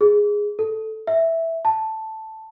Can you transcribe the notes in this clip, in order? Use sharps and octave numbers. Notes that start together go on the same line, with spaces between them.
G#4
A4
E5
A5